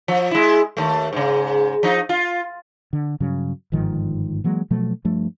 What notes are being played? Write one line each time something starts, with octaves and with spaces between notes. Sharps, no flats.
F3
G#3 E4
D#2 A3
G#2 C#3
F3 D#4
F4
D3
G2 C#3 F#3
G1 G#2 D#3 F3
E3 F#3 G#3 A#3
B2 F3 F#3 A3
G2 F3 A3